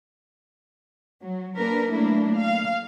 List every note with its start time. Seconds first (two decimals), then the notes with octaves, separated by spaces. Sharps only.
1.22 F#3
1.56 A#3 D4 A#4 B4
1.92 F#3 A3 A#3 D4 E4
2.38 F5